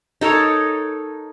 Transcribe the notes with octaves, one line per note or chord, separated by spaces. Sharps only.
D#4 A4 A#4 C#5